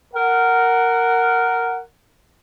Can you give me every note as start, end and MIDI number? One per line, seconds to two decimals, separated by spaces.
0.14 1.82 70
0.14 1.82 78